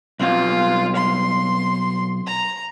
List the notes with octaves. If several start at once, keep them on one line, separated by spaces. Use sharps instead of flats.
B1 C4 F4 F5
C6
A#5